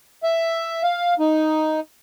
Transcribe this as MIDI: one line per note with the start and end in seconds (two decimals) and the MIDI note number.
0.23 0.82 76
0.83 1.14 77
1.20 1.80 63